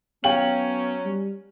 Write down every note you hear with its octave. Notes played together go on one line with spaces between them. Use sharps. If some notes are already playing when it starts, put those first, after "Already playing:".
F#3 B3 C#4 F5 G5 F#7
G3